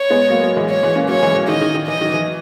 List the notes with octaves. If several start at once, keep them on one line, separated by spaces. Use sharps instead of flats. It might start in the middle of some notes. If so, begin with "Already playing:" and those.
Already playing: C#5
G#3 B3
F#3 A#3
F#3 A#3
E3 G#3
C#5
E3 G#3
A#3 C#4
F#3 A#3 C#5
E3 G#3
E3
D#3 D#5
D#3
D#3
E3 D#5
D#3 F#3
E3